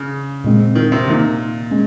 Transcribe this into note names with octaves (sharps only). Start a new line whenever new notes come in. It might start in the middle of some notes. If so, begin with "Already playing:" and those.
Already playing: C#3
A#2 G#3 C4
D#3
C3
A#2 D#3 A#3 D#4
G#3 C#4